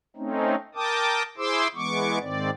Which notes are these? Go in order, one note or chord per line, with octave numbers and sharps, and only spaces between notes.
A3 C4 C#4 D#4
A#4 G5 A5 D6 D#6
E4 G#4 C5 C6 D6 E6
E3 G#3 B3 C#6 D6
G#2 D#3 C4 D5